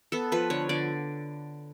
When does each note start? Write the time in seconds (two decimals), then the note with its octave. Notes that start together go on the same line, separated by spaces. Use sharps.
0.12 B3 A4
0.32 F3 B4
0.50 D3 C#5
0.69 D3 D5